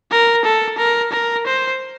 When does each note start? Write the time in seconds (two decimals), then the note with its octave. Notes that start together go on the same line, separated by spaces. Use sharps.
0.12 A#4
0.45 A4
0.78 A#4
1.13 A#4
1.46 C5